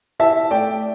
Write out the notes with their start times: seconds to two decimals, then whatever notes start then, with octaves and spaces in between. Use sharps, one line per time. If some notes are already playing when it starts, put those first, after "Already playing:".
0.19 E4 E5 A5
0.51 A3 D5 G5